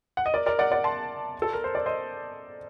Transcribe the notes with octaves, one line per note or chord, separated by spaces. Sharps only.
F#5
D#5
A#4 D5
A#4 D5
D5 F#5
D5 F#5
A5 C6
A4
A#4
C5
D5
C5 D#5